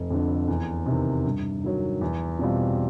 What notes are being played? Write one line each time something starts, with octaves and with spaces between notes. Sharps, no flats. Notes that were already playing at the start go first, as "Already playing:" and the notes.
Already playing: F1
F2 D3
E2
C3 D#3
G2
D#3 F#3
E2
B2 G3 C4 F4